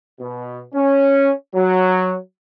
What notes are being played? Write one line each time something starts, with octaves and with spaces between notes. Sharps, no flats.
B2
C#4
F#3